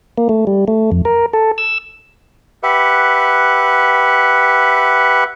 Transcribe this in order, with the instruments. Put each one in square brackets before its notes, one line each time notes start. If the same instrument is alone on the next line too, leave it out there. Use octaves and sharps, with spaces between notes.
[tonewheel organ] A#3
A3
G3
A3
F2
A#4
A4
E6
[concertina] G4 B4 E5 F#5